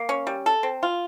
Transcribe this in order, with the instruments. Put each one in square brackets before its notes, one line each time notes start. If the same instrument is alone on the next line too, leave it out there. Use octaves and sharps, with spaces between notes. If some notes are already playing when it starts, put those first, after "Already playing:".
Already playing: [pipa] A#3
C#4
G3
A4
C4
F4